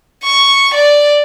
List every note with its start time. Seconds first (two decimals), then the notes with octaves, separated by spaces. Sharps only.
0.24 C#6
0.74 D5